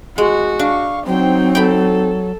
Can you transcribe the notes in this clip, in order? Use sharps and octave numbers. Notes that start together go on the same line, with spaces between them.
G#3 F#4
D4 F5 C#6
F#3 C4 D#4 C5 G5
A4 G5 B5